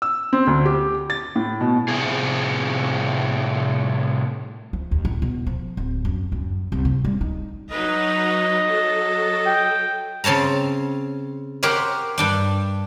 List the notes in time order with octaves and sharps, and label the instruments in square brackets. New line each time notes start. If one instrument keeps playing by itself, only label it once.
[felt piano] E6
C4
D2
G4
A6
A2
B2
[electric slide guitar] A2 C3 F3 G#4
[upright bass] F3
D#2
A2
B2
F3
D1
F#2
F#2
C2
C3
G3
D#4
[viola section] F#3 D#4 B4 [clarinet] D#5
[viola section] F#3 A4
[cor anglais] G5
[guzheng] C#3 C4 C#5 A5 A#5
G4 A#4 C5 C#5 F#5 G5
G2 D4 G5